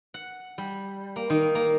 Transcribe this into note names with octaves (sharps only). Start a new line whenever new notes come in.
F#5
G3
A#3
D#3
A#3